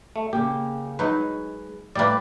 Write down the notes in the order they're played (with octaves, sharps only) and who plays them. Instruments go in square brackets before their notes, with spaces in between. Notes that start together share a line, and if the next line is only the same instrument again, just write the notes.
[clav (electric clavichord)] A3
[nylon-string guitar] C#3 A#3 [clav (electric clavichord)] G4
[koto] F#3 D#4 [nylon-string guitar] G#3 [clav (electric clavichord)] B4
[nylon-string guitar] A2 [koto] G3 A#3 [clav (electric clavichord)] B4 D5